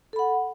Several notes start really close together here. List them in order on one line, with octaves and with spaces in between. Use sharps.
A4 B5 F#5